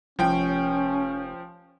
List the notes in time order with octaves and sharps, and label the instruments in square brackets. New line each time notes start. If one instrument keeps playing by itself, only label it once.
[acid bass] F1 [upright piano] F3 G5 [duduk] C#4